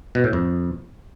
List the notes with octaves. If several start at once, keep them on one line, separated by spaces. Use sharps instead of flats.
B2
A2
F2